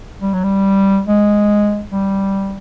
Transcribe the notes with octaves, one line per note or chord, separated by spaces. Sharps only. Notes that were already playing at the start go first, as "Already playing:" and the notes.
G3
F#3
G3
G#3
G3